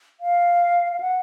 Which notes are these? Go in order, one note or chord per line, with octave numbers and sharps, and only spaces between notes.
F5
F5
F#5